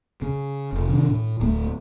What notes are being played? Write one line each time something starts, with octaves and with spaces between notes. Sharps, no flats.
C#3
F1
C3 D#3 D4
A2
D1 A3